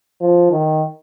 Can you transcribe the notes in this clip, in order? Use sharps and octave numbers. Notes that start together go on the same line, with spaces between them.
F3
D#3